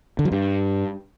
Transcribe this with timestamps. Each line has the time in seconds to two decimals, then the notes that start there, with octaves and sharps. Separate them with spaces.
0.19 D3
0.25 F#3
0.32 G2